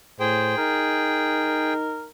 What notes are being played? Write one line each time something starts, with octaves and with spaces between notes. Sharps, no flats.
A2 G#4 C5 G5
D#4 A#4